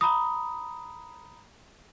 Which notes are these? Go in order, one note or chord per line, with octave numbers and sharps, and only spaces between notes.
A#5 B5 D#6